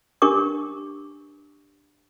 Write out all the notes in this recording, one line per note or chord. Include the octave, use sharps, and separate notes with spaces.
D4 G4 A#4 C#6 D6